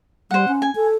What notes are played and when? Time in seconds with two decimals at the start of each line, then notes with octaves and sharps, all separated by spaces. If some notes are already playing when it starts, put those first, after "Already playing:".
0.31 G3 C5 F#5
0.48 C#4
0.62 G#5
0.75 A4